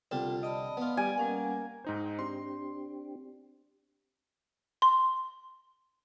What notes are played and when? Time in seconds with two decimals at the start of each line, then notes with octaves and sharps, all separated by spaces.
0.11 C2 D3 C4 F4 G4 A4
0.43 D5 D#5 A5 B5
0.77 B3 F4
0.97 G3 D5 G#5
1.18 G3 A#3 C#4 F#5
1.85 G#2 D#4 C5 G5
2.19 C4 D4 G4 C6
4.82 C6